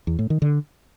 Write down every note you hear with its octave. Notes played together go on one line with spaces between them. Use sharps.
E2
A2
D#3
D3